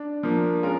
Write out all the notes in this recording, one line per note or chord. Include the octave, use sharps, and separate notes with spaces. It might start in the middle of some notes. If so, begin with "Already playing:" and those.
Already playing: D4
F3 A#3 D4
G#3 C#4 F4 A#4